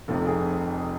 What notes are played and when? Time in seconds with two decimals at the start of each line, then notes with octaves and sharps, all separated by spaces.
0.08 F1 F2 C3 A4
0.27 G#4